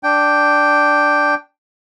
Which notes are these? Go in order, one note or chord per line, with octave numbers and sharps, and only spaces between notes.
D4 G5